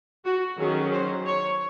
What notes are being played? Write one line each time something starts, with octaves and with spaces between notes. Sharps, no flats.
F#4
D#3 F#3 C#4 G#4
C5
C#5